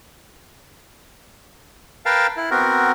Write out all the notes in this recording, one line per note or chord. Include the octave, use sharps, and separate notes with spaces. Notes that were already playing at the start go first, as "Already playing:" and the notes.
A#4 B4 F5 G5 A5
E4
B3 C4 F#4 A#4